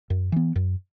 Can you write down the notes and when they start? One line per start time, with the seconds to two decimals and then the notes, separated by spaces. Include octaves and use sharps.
0.10 F#2
0.32 E3 B3
0.56 F#2